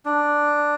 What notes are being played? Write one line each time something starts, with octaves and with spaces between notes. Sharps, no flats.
D4